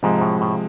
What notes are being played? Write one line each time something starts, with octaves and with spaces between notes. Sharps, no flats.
G#2 C3 F3 G#3
A2
A2